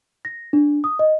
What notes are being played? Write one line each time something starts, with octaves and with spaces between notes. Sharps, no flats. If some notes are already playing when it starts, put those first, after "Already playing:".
A#6
D4
D#6
D#5